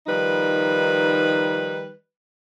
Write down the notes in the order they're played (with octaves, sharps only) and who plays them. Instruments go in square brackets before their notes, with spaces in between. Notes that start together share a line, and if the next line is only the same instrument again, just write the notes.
[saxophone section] D#3 F3 G3 D#4 B4